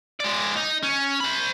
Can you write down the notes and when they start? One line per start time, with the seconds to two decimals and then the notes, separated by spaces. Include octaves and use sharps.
0.20 G#3 D5
0.55 D#4
0.83 C#4
1.20 C5 B5